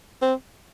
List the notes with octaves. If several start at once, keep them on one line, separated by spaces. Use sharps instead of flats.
C4